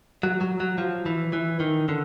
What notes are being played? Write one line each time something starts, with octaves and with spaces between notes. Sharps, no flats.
F#3
F#3
F#3
F3
E3
E3
D#3
D3